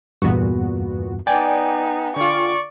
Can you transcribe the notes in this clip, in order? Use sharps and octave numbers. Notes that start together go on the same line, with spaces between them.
E2 G2 A#2 B3 F#4
B3 D#4 D5 G5 G#5
D3 F4 D5 C#6